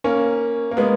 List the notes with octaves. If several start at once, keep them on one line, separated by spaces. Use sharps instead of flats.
A#3 C#4
A#3
G#3 B3